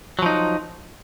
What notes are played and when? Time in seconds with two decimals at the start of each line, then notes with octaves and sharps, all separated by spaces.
0.19 F#3
0.22 F3
0.26 D#4